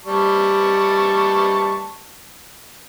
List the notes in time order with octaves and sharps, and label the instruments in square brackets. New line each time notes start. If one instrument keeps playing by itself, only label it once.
[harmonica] G3 A5 C#6